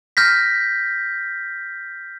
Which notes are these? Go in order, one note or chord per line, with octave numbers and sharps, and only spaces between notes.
F6 G6 A#6 B6